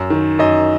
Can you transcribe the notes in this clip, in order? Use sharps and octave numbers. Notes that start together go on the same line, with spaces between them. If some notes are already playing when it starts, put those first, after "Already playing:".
Already playing: F#2
D#3
F#2 D#5